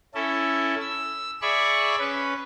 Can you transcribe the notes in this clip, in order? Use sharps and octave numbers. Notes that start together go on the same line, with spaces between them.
C#4 E4 A4
E6
G#4 D5 E5 B5 C#6
C#4 B4